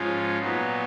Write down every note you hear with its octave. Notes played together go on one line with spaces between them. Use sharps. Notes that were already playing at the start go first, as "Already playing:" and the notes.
Already playing: G#2 F3 G#3 C#4 F4
A#2 F#3 B3 D#4